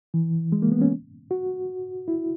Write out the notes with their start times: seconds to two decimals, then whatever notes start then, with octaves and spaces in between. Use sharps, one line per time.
0.14 E3
0.52 G#3
0.62 A#3
0.72 B3
0.82 C#4
1.31 F#4
2.08 E4